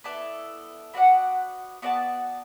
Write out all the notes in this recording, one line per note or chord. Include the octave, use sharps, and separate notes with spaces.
B3 E4 A4 D5
B3 F#4 D5 F#5
B3 F#4 D5 A5